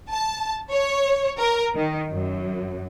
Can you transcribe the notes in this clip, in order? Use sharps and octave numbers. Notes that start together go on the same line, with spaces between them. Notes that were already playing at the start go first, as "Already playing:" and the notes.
A5
C#5
A#4
D#3
F#2